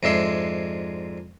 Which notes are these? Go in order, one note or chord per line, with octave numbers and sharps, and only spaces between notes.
F2 G#2 G#3 D4 E5 C6